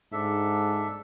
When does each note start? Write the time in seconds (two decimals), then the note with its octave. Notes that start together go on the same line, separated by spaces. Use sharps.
0.12 G#2 D4 A4 E5